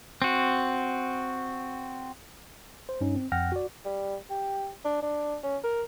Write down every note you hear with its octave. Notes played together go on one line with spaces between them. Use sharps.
C4 F#4
C5
G2 C#4 D#4
C4
F2 F#5 G5 F6 A#6
F#4 D5
G3
G4
D4
D4
C#4
A#4